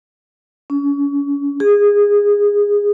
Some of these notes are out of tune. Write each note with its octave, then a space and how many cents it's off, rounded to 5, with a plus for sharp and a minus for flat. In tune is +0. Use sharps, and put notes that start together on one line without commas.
C#4 +35
G#4 -20